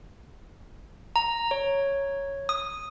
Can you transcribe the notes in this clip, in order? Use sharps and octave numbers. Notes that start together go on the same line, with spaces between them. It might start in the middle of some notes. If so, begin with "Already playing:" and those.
A#5
C#5
D#6